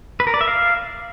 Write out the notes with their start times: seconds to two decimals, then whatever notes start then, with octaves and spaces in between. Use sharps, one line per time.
0.20 B4
0.27 A#4
0.34 D5
0.41 E5
0.48 F5